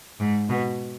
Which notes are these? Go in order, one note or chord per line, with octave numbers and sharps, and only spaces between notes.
G#2
B2